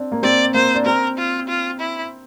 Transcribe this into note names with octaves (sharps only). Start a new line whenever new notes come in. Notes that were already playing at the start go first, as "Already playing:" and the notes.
Already playing: C4 D4
A#3
C4 D5
A#3 C5
D4
C4 A#4
F4
F4
E4